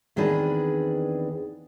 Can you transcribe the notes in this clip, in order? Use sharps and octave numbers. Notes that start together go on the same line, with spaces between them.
E2 D#3 C4 D4 G#4 B4